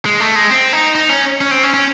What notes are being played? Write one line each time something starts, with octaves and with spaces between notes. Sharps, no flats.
G#3
A3
G#3
C4
D#4
D#4
C#4
C#4
C4
C#4
C#4